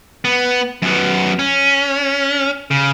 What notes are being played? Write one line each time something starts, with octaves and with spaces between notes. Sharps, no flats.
B3
F#2 B3
C#4
C#3